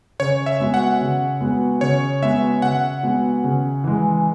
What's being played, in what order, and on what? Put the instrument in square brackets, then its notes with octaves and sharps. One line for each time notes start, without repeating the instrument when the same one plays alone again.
[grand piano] C#3 [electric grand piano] C#5
[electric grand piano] E5
[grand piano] G#3 B3 F#4
[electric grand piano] F#5
[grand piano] C#3
G#3 B3 F#4
[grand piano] C#3 [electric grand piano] C#5
[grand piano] G#3 B3 F#4 [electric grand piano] E5
[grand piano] C#3 [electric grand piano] F#5
[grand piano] G#3 B3 F#4
C#3
E3 G#3